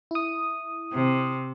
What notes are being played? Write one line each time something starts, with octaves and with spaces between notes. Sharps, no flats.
E4 D#6
C3